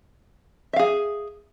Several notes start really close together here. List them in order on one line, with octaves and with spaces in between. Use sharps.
E5 F5 G#4